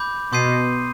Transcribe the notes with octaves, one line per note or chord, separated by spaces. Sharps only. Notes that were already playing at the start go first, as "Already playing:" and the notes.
Already playing: B5 D6 G6
B2 C6 D#6 G6 C7 D#7